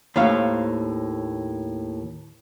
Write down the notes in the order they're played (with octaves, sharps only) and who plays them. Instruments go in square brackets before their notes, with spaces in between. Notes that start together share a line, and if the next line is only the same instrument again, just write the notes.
[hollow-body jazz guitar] D#2 A2 C5 C#5 F5